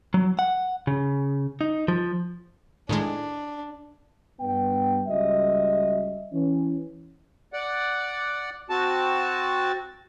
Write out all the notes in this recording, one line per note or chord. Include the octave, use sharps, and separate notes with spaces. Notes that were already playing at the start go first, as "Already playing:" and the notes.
F#3
F#5
C#3
D#4
F3
A2 D#3 G#3 D4
G2 B3 G5
C#2 G3 F#4 D#5 E5
E3 C#4
D5 F#5
C4 F#4 A5